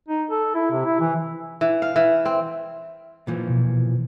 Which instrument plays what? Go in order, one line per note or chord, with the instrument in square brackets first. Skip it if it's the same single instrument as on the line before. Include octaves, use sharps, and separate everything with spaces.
[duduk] D#4
A4
E4
C3
E4
E3
[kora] E3
F5
E3
C4
[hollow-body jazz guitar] A#2 E3 F3
[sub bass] B2